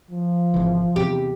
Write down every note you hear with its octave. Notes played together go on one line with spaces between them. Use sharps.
F3
G#1 C#3 E3
E2 C3 G4